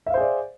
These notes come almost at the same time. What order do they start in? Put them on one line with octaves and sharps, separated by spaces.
E5 F5 C5 G#4 D5